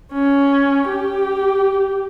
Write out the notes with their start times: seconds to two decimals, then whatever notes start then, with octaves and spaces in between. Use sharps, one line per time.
0.14 C#4
0.89 G4